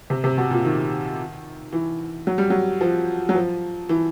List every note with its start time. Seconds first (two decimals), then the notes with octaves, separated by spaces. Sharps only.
0.10 C3
0.24 C3
0.37 B2
0.51 A#2
0.65 D#3
1.73 E3
2.27 F#3
2.38 G3
2.50 F#3
2.81 F3
3.29 F#3
3.35 F3
3.89 E3